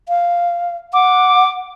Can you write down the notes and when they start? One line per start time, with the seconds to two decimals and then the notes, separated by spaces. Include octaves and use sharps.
0.09 F5
0.93 F#5 D6